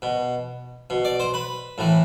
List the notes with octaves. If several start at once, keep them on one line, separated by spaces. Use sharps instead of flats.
B2
B2
D5
C5
B4
A2 E3